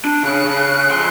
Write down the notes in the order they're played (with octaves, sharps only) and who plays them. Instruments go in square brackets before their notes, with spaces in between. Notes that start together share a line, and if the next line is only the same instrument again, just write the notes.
[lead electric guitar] D4
[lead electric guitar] C#3 [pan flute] F#6
[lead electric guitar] C#3
F2 C6